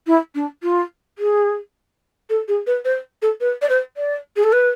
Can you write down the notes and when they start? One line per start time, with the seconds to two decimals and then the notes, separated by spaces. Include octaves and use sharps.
0.07 E4
0.35 D4
0.63 F4
1.18 G#4
2.30 A4
2.48 G#4
2.67 B4
2.85 C5
3.22 A4
3.40 B4
3.62 D5
3.69 C5
3.97 D5
4.36 G#4
4.44 A4
4.52 B4